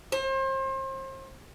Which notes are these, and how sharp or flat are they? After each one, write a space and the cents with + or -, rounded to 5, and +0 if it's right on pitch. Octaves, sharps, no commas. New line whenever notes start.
C5 +35